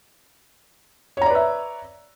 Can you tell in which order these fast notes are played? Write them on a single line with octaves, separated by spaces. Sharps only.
C#5 A#5 D5 B4 E5